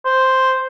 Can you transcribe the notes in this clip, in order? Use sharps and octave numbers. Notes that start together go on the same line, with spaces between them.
C5